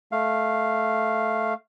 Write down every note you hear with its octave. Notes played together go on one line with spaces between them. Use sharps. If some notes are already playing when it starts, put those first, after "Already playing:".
A3 F5